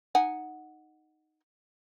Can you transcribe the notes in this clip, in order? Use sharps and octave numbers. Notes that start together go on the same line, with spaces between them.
D#4 F#5 G#5